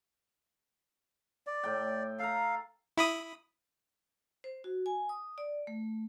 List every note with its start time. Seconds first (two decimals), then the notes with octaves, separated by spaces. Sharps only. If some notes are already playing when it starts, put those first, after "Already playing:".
1.47 D5
1.63 A2 G5
2.19 A4 F5 A#5
2.97 E4 B5 D#6
4.44 C5
4.64 F#4
4.86 G#5
5.09 D#6
5.38 D5
5.67 A3